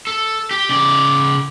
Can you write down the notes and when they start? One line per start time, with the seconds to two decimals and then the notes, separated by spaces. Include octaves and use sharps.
0.07 A4
0.51 G4
0.69 C#3 D5